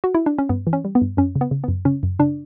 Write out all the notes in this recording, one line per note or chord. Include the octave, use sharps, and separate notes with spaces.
F#4
E4
D4
C#4
G2 B3
E3
C#4
G3
B3
G2
F#2 C#4
C#3
B3
C#3
B3
F#2
C#3 C#4
F#2
C#3 D4